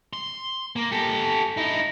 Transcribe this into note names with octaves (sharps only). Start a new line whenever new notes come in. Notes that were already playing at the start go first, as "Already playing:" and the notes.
C6
A#3
G4 A4
D#4 E4